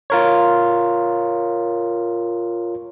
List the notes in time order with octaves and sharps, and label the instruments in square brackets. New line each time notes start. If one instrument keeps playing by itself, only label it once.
[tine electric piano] F4 A#4 C#5